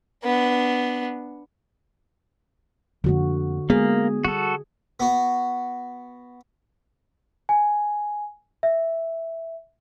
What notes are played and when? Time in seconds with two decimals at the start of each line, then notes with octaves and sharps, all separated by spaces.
0.24 B3 D4
3.04 F2 D3 A#3 F#4
3.70 G#3 A#3 B3 D#4 G#4
4.25 G3 F#4 A4
5.00 B3 F#4
7.49 G#5
8.63 E5